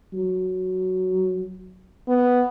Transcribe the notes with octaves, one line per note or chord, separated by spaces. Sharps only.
F#3
B3